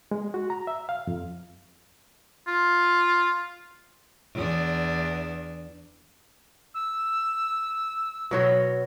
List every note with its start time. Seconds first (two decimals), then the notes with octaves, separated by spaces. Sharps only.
0.11 G#3
0.34 F#4
0.50 A#5
0.67 E5
0.89 F5
1.07 F2
2.47 F4
4.34 E2 D4
6.74 E6
8.31 B2 F#3 C#5